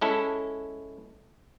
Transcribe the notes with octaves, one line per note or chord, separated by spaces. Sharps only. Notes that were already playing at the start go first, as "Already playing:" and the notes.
G#3 C#4 E4 A4